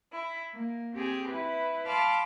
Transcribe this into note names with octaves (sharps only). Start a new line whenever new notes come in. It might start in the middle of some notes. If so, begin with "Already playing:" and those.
E4
A#3
C4 G4 G#4
E4 B4
F5 A5 B5 C6 D6 F6